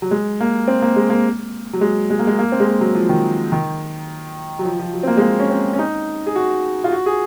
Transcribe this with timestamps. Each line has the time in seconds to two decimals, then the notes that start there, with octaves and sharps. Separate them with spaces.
0.02 F#3
0.11 G#3
0.41 A#3
0.68 C4
0.82 A#3
0.96 G#3
1.10 A#3
1.73 F#3
1.81 G#3
2.10 G#3
2.19 A#3
2.27 G#3
2.39 A#3
2.52 C4
2.60 G#3
2.66 A#3
2.81 F#3
2.95 F3
3.09 D#3
3.52 D#3
4.59 F#3
4.65 F3
4.79 F3
4.93 F#3
5.03 C4
5.07 A#3
5.17 G#3
5.21 A#3
5.40 C#4
5.50 C4
5.74 C#4
5.79 D#4
6.26 G#4
6.36 F#4
6.84 F4
6.92 F#4
7.06 G#4